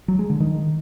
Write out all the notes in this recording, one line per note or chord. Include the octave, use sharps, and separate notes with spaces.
F#3
G#3
D3
D#3